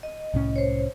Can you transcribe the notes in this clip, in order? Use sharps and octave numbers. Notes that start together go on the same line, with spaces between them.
D#5
C2 A2 C#4
C5 C#5